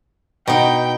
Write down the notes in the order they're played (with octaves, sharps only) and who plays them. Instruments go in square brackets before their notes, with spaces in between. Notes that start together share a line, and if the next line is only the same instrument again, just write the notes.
[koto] B2 D#4 [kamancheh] G5